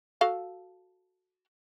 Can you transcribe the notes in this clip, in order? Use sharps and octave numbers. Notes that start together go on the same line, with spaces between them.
F#4 A4 F5